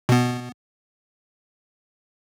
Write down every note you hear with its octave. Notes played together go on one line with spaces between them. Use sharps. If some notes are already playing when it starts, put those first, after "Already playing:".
B2 B3